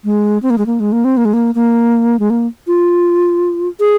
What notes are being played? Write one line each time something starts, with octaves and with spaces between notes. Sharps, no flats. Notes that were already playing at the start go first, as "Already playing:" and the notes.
G#3
C4
A#3
G#3
A#3
G#3
A#3
C4
A#3
G#3
A#3
A#3
G#3
A#3
F4
G#4